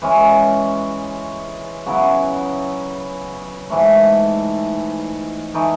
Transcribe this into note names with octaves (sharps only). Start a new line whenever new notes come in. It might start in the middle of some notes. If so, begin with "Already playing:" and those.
E3 G#3 C#4
C#3 F#3 B3 E4
G#2 E3 A3
E3 A3 D#4